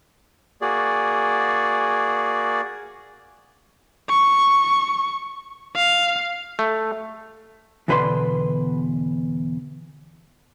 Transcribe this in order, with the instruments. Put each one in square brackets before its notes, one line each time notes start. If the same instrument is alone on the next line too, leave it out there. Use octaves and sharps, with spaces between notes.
[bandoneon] A#3 F#4 G#4 D5
[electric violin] C#6
F5
[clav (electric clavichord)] A3
[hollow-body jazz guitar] E2 B2 D3 B4 D5 C6